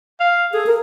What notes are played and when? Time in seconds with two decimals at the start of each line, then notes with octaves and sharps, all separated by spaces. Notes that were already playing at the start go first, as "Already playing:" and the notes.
0.20 F5
0.54 G#4 A4
0.66 A#4